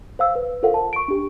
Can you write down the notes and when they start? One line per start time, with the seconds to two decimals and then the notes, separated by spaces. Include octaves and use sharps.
0.19 C5 F5 E6
0.35 B4
0.63 F4 A4 A#4 C5 F5 F#5
0.74 A5
0.93 C#6 D7
1.08 D4 G4